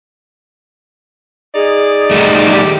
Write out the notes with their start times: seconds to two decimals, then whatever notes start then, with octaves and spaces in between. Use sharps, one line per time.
1.55 D#4 G#4 D5
2.11 D#3 G3 A3
2.54 G4